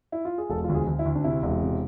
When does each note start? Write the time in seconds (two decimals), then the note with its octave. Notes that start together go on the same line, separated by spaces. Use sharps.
0.12 E4
0.25 F4
0.38 G#4
0.50 E1 A4
0.64 F4
0.69 D2
0.75 G#4
0.87 D2
0.99 E4
1.05 D2
1.15 D4
1.24 C3 E4
1.43 E1
1.61 C3